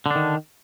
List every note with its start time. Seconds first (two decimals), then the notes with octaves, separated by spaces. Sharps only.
0.06 D3
0.11 D4
0.15 D#3